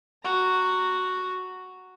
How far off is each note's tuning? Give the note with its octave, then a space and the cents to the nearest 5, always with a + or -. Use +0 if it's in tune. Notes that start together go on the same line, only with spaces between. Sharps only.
F#4 +0 A#5 -15